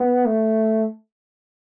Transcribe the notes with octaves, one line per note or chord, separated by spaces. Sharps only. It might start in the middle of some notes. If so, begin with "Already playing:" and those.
Already playing: B3
A3